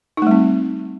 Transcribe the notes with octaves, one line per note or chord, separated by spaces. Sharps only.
G3 A3 C4 D#4